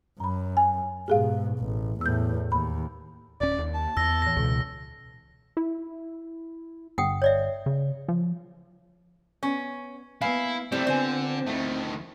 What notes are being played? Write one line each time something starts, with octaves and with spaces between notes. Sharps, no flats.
F#2 A#5 B5
G#5
G#2 B2 G4 G#4 F5
A1
E2 A2 E6 G6
D#2 B5
D1 C#4 D5
D#2
A5
E2 E6 A#6
A2 E3 A#6
C#2 B2
E4
G1 F#5 G5 D#6
C#5 D5 E5
C#3
F3
B3 C#4
A#3 B3 E4 F5 G#5
C3 G3 A3 C4 E4 G4
D3 B3 F4 C5 G#5
D2 D#3 A3 E4